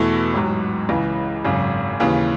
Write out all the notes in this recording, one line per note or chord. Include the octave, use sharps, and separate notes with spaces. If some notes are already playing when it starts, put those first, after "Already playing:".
Already playing: E2 B2 A3 E4
A1 G#2 F#3
C#2 C#3 E3
G#1 F#2 C#3
D#2 C#3 E3